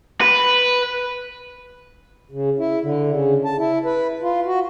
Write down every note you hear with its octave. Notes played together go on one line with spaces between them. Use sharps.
B4
C#3
E4
D3
C#3
A5
E4
B4
F4
F#4